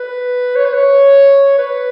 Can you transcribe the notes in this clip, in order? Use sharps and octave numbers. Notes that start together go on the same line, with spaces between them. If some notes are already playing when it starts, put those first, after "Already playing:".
Already playing: B4
C#5
B4
C#5
B4